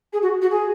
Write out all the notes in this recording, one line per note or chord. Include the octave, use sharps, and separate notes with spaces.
G#4
F#4
F#4
G#4